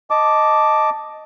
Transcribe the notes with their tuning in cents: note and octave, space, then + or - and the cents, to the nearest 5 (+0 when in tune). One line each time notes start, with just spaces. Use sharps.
D#5 +0 A5 +0 D6 +0